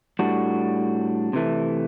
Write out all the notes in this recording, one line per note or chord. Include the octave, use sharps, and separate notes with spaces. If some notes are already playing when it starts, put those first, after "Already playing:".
A2 G3 D4 F#4
C3 E3 A3